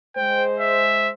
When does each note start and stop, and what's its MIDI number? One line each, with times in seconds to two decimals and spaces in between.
0.16 1.11 56
0.16 1.11 72
0.16 0.44 79
0.60 1.10 76